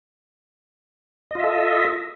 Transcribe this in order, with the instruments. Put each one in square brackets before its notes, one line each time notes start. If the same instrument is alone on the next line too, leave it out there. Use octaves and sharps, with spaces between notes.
[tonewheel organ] D#5
F4
E5
A4